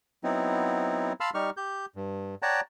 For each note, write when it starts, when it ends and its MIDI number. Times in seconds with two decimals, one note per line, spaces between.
0.24 1.13 54
0.24 1.13 59
0.24 1.13 60
0.24 1.13 63
0.24 1.13 64
1.20 1.30 77
1.20 1.30 81
1.20 1.30 83
1.20 1.30 84
1.20 1.30 88
1.20 1.30 89
1.34 1.50 55
1.34 1.50 63
1.34 1.50 67
1.34 1.50 85
1.34 1.50 89
1.57 1.86 67
1.57 1.86 91
1.96 2.35 43
2.42 2.61 73
2.42 2.61 74
2.42 2.61 78
2.42 2.61 79
2.42 2.61 81
2.42 2.61 82